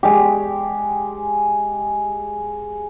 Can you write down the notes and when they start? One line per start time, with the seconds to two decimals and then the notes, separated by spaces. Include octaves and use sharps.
0.03 G#3 G4